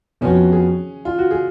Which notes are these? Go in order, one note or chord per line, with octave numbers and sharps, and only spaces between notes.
F2 F3 B3 C#4 F#4
G#4
F4
F#4
G#4